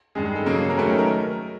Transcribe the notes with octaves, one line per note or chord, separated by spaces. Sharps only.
G2 D#3 G#3 G#4
G#4
A4
C#3 F#3 A#3 C#4
G#4
A4
A#4
D#3 F#3 A3 C#4 B4
A#4
A#4